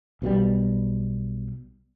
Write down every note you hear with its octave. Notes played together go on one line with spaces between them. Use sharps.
B1 B2 D3 G3